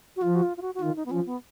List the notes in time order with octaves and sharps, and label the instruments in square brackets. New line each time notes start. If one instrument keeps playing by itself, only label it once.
[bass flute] F#4
[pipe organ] F3 [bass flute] F4
[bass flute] F#4
F4
F4
F#4
F#4
[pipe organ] D#3 [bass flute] F4
[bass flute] D#4
B3
[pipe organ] F3 [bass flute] C#4
[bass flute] B3